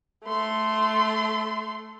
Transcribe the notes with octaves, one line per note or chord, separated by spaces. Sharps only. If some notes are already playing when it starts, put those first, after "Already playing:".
A3 C6